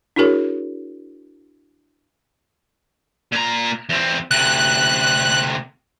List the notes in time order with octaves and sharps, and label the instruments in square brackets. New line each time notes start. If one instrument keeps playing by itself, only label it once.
[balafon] D4 E4 F#4 G#4 A#4 C#5
[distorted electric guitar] A#2 A#5
E2 C4
[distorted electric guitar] D2 C3 [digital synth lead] F#6